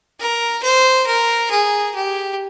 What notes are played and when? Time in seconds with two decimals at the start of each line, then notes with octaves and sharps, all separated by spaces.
0.20 A#4
0.63 C5
1.07 A#4
1.51 G#4
1.95 G4